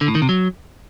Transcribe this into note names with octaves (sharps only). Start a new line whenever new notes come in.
D3
A2
D#3
C3
F#3